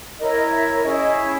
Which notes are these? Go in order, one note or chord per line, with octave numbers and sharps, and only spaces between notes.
E4 A#4 C#5 D#5
E5
C#4 E4 G#4 D#5
D#5
C#5